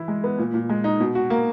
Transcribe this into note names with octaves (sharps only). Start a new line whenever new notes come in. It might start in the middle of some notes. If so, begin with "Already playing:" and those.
Already playing: E3 E4
G#3
B3
A#2
A#2
G#3
D#4
B2
F#4
A#3